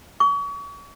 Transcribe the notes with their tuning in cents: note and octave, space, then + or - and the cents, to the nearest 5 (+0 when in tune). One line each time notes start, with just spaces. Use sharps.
C#6 +35